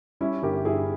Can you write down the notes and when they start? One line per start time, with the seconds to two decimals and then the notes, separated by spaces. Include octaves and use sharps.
0.21 G3 C#4 E4
0.42 G1 G4 A#4
0.65 G2 E4 G#4